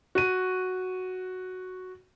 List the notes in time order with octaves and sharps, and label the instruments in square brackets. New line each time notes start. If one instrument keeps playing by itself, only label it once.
[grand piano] F#4 D#7